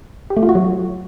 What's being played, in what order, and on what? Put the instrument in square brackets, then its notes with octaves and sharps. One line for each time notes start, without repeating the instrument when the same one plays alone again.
[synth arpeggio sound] G4
A3
F4
F#4
F#3